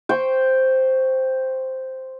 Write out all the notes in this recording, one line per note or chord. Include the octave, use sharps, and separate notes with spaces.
C5 G5 C#6